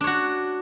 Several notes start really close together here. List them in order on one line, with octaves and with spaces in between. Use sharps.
D4 C#5 F#4